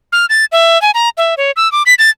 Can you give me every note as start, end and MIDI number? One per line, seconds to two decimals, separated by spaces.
0.12 0.26 89
0.30 0.45 93
0.52 0.81 76
0.82 0.91 80
0.94 1.09 82
1.18 1.35 76
1.37 1.51 73
1.56 1.71 88
1.72 1.83 86
1.86 1.94 95
1.99 2.10 93